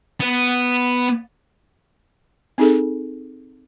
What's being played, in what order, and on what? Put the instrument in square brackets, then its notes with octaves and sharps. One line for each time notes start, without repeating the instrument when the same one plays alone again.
[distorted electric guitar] B3
[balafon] C4 D#4 G#4 A4